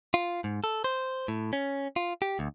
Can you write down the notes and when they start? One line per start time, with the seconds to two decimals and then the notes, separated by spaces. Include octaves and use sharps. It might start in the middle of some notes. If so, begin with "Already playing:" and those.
0.14 F4
0.44 G#2
0.64 A4
0.84 C5
1.28 A2
1.53 C#4
1.96 F4
2.22 G4
2.39 D2